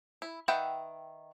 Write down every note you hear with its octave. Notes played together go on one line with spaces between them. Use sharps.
E4
D#3 B4 E5 F#5 G5